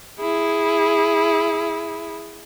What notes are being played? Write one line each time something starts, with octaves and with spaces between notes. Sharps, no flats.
E4 G#4